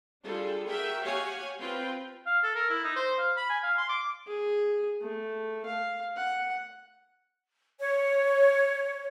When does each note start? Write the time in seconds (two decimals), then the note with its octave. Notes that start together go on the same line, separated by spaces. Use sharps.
0.23 G3 D4 F4 G#4 A4
0.66 F#4 G#4 A#4 E5 G5
1.01 F#4 G4 C#5 F5 F#5 G#5
1.60 C4 F4 B4 G5
2.26 F5
2.43 A4
2.55 A#4
2.69 E4
2.84 D#4
2.96 C5
3.19 F5
3.36 B5
3.50 G#5
3.63 F5
3.78 C6
3.89 D6
4.27 G#4
5.01 A3
5.65 F5
6.16 F#5
7.80 C#5